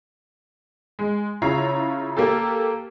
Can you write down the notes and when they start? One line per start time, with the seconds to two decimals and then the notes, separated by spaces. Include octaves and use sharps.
0.99 G#3
1.42 C#3 E4 F4 C#5 A#5 C7
2.17 A#3 G4 A4